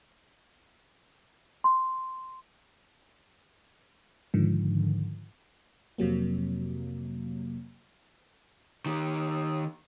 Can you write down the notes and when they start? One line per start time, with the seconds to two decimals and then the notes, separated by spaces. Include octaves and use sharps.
1.64 C6
4.34 G#2 D3 D#3 F3
5.98 F2 C3 F#3 A#3
8.86 D#3 G4